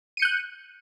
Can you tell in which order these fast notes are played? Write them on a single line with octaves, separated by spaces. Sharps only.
D#7 C#7 G6 F#6